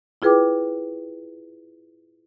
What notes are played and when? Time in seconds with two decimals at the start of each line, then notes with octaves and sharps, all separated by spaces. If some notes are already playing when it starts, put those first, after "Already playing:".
0.22 E4 F4 G#4 B4 G5 D6